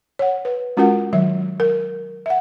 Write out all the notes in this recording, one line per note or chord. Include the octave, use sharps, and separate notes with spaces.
C#5 F#5
B4
G#3 C#4 F4 F#4 A#4 F#5
D#3 F#3 E5
A#4
E5 F#5